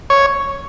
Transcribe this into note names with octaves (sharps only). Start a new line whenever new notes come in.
C#5